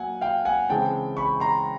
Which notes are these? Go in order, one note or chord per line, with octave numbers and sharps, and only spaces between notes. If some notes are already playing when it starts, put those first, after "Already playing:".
Already playing: F#3 A#3 F#5 G#5
F5 G5
F#5 G#5
C#3 E3 G#3 C4 G5 A5
B5 C#6
A#5 C6